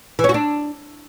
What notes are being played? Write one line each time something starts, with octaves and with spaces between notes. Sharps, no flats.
E3
C#4
F#4
D4